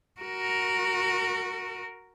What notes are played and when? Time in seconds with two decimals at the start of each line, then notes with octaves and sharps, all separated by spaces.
0.21 F#4 A#4